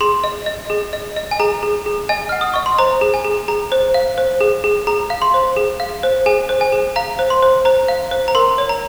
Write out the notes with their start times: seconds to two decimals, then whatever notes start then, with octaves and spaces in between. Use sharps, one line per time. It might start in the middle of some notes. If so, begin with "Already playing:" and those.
0.01 G#4 C6
0.24 D#5
0.46 D#5
0.70 G#4
0.93 D#5
1.16 D#5
1.31 G#5
1.40 G#4 A#5
1.63 G#4
1.86 G#4
2.09 D#5 G#5
2.29 F#5 F6
2.41 D#6
2.54 D#5 C#6
2.66 C6
2.78 C5 A#5
3.01 G#4
3.14 G#5
3.25 G#4
3.48 G#4 A#5
3.72 C5
3.94 F5
4.18 C5
4.41 G#4
4.64 G#4
4.87 G#4 A#5
5.10 F5
5.22 C6
5.34 C5
5.57 G#4
5.80 F5
6.03 C5
6.26 G#4 G#5
6.49 C5
6.61 G#5
6.72 G#4
6.96 F5 A#5
7.19 C5
7.30 C6
7.42 C5
7.65 C5 A#5
7.88 F5
8.11 C5
8.28 A#5
8.35 A#4 C6
8.58 C#5
8.69 A#5